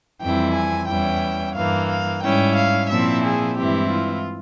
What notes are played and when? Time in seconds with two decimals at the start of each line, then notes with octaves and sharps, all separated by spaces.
0.21 F2 E3 G3 C4 E4 G5
0.55 G#5
0.88 E2 E3 G3 C#4 E4 G5
1.56 G2 E3 A#3 F5
1.90 F5
2.23 G#2 G3 C#4 E4 G5
2.56 F5
2.90 A#2 F3 C4 E4 E5
3.24 G#4
3.58 G2 E3 G#3 C4 E4 G4
3.91 F4